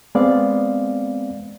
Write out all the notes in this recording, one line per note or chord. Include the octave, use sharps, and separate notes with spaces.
G#3 B3 C4 D5 F5